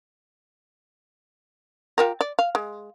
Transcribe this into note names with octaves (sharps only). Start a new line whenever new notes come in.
F4 G4 A#4
D5
F5
G#3